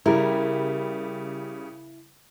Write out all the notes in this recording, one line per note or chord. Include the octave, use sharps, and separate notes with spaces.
C#3 G3 E4 A#4